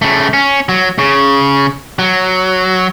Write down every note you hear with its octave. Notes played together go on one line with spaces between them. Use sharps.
C#3 A3
C#4
F#3
C#3
F#3